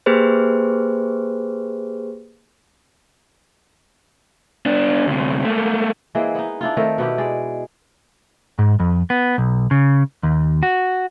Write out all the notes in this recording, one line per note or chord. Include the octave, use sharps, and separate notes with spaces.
A#3 G4 G#4 B4 C5
B3 D4
D2 C3
A3 A#3
E3 G#3 A#3 C4
B3 D#4
D4 E4 F4
D#3 A3 C4 A#4
B2 B3 E4 G4
G#3 D5
G#2
F2
B3
B1
C#3
D#2
F#4